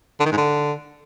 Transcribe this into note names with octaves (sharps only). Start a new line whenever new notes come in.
D3
D#3
G#2
D3